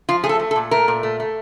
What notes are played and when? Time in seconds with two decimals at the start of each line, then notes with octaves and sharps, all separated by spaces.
0.09 F3 F4
0.24 A3 G#4
0.29 A4
0.39 A3
0.51 A4
0.56 A#2
0.71 A3 A#4
0.88 A#2
1.03 A3
1.20 A3